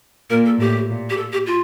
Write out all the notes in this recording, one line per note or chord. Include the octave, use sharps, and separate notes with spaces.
A#2 A#4
A4
A2 G4
A#2
G4
A4
G4
F4